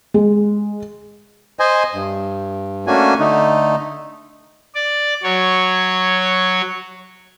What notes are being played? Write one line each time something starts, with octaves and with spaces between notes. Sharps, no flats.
G#3
C5 D#5 G#5
G2
A3 A#3 C#4 D4 F#4 G#5
D3 A3 D#4
D5
F#3 C#5